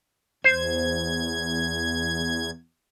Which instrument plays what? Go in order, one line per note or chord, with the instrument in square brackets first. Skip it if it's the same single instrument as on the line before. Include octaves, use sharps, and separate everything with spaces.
[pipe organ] E2 G#6 [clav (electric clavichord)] C5